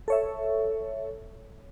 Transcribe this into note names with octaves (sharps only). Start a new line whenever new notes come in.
A4 C#5 E5